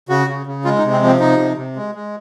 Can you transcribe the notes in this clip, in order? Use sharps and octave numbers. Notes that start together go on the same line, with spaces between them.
C#3 F#4
C#3
C#3
G#3 F4
D#4
C3
C4
F3 C4
C3 D#4
C3
C3
G#3
G#3